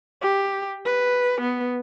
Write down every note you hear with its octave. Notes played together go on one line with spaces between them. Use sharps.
G4
B4
B3